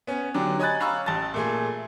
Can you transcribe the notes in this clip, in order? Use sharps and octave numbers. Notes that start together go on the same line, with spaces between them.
B3 C#4
D3 F#3 D4 G4
C#5 D#5 G#5 B5 F#6 A6
F5 A#5 B5 C#6 E6
A1 A5 A6
A#2 A3 G#4